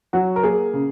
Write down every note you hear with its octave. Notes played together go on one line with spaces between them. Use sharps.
F#3 F#4
A#4
A#3 G#4
C#3